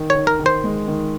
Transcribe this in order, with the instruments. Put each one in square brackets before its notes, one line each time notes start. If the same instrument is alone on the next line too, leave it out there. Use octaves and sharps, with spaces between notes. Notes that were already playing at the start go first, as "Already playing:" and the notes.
Already playing: [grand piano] D#3
[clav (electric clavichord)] C#5
[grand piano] D#3
[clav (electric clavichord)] A#4
[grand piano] D#3
[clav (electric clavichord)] C5
[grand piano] G#3
D#3